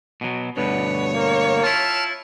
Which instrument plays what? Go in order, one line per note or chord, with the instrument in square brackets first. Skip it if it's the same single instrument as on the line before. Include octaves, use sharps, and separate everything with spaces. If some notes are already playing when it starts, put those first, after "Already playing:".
[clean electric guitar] B2 F#3
[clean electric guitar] D2 G2 B2 [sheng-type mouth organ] B4 [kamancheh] C#5
[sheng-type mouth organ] A#3
[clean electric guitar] E4 F4 [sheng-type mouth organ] A5 F6